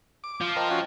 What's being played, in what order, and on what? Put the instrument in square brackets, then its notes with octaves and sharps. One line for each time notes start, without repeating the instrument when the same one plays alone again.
[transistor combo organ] D6
[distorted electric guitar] F3
[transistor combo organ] A#4 C5 [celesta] D#5 G5 A5
[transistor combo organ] C#4 F4 F#4